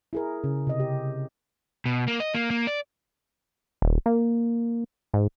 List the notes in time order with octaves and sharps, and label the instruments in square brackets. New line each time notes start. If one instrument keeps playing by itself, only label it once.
[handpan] E4 G#4 A#4
C#3
C3 D#5
G4
[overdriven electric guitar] B2
A#3
D#5
A#3
A#3
D5
[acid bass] D#1
A#3
G#2